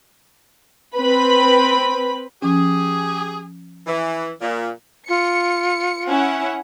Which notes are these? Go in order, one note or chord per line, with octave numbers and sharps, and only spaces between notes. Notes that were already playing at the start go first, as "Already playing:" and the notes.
C4 B4 B5
F3 C#4 G4 G#4
E3
A#2
F4 C#7
C#4 E4 F#5